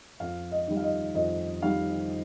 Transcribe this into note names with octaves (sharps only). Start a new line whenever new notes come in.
F2 F5
D#5
D#3 G3
F5
D#5
F2 D#5
D#3 G3 F5